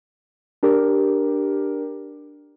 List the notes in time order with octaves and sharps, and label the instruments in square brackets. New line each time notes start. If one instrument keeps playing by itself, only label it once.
[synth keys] D4 G4 A#4